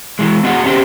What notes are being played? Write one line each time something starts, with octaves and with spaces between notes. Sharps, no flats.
E3 G#3
B3 F#4 G#4 F#5
B3 C#4 D4 F4 G4 C5